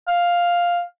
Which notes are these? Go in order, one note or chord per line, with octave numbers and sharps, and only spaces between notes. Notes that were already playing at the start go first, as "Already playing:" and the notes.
F5